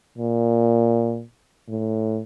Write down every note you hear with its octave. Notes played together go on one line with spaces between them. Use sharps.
A#2
A2